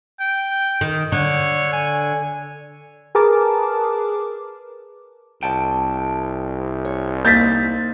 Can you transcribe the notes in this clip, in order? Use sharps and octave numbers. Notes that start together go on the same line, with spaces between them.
G5
D#3
D3 C#5
G#5
G#4 A#4 B4 A5 D6
C2 G5 A5
C#5
A#3 C4 D#4 G6 A6 B6